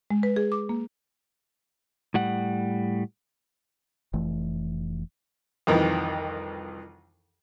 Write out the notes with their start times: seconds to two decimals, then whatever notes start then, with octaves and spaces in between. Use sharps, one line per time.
0.10 G#3
0.23 B4
0.36 G#4
0.52 D6
0.69 A#3
2.14 A2 G3 F#5
4.13 F1 E3 A3
5.67 C2 F2 D#3 E3